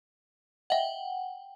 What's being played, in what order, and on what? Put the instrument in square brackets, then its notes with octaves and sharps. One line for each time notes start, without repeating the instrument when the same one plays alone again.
[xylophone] D#5 E5 [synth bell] F#5 G5